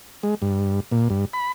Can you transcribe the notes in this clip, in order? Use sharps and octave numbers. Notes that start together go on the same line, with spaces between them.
G#3
G2
A#2
G2
B5